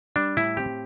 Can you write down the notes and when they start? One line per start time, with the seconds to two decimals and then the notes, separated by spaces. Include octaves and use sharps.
0.16 G3 D4
0.37 A2 E4
0.57 C4 G4